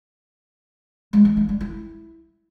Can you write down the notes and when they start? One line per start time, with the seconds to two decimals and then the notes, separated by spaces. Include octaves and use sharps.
1.13 G#3
1.25 E3
1.37 D#4
1.49 G3
1.61 E4